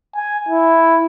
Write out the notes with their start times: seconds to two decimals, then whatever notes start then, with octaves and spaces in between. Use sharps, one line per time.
0.16 G#5
0.49 E4